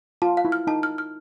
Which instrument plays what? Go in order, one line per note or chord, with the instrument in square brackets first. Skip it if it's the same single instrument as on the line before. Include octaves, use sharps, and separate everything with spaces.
[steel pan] F4 [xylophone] A5
[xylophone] F5
[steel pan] E4
[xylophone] F6
[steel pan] D#4 [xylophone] A5
[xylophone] F6
F6